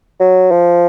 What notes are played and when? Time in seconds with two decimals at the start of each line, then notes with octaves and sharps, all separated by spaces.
0.20 F#3
0.51 F3